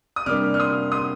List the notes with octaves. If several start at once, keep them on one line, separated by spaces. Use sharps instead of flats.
D#6
C3 G3 A#3 D4 D6 F6
F6
C6 D#6
C6 D#6